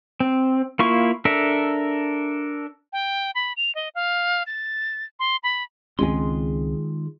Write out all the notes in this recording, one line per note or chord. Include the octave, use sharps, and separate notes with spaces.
C4
A#3 E4 F4 C#6
D4 A4 A#4 E5
G5
B5
F7
D#5
F5
A6
C6
B5
C#2 D#3 G#3 C4 C#4 F4 G#4 C6